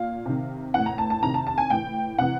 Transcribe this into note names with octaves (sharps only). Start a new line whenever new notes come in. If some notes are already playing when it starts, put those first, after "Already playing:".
Already playing: A#2 F5
C3 D#3
A2 E3 F#5
A#5
A5
A5
C3 D#3 A#5
A5
A5
G#5
A2 E3 G5
C3 E3 F#5